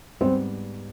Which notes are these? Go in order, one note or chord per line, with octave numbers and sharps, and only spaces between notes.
G#2 G3 B3 C4